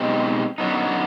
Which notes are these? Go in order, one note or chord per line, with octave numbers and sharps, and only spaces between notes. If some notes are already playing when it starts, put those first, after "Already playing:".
Already playing: B2 G#3 C4 D#4 G4
F#2 D3 F#3 B3 D#4